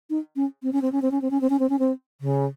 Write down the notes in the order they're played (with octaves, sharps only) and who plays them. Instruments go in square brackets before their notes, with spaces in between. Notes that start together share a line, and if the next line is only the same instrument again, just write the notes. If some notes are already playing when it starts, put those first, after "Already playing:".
[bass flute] D#4
C#4
C4
C#4
C4
C#4
C4
C#4
C4
C#4
C4
C#4
C4
C#4
C4
C#3